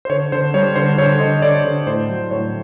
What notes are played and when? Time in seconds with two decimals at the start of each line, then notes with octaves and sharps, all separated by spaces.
0.05 C5
0.09 D3 C#5
0.32 D3 C5
0.54 G3 C#5
0.76 D3 C5
0.98 D3 C#5
1.20 D3 D#5
1.42 D3 D5
1.65 D3 C#5
1.87 A2 C5
2.09 F#3
2.31 A2 C#5